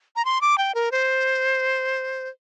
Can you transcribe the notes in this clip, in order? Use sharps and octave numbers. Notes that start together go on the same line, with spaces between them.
A#5
C6
D6
G5
A#4
C5